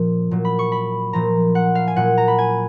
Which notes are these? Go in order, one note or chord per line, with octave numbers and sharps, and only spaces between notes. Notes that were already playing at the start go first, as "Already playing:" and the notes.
Already playing: A#2 F3
A#2 F#3
B5
C#6
B5
A#2 F3 A#5
F#5
F5
G#5
A#2 F#3 F#5
A#5
B5
G#5